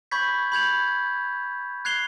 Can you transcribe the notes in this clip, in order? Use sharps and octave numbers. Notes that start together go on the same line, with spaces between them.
B5 C#6 G6 G#6 B6
B5 G6 G#6 F7
F#6 G#6 C7 F7 G7